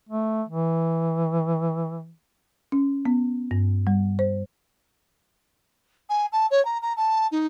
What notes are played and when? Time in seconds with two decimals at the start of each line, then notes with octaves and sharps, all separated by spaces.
0.09 A3
0.49 E3
2.72 C#4
3.05 B3
3.51 G2
3.87 G3
4.19 C5
6.09 G#5
6.32 A5
6.51 C#5
6.65 A#5
6.82 A#5
6.97 A5
7.32 D#4